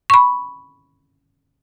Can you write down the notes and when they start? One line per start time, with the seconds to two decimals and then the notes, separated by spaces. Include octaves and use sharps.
0.10 B5 C#6